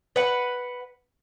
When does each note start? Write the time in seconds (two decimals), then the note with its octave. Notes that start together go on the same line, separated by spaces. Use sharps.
0.16 B4 F#5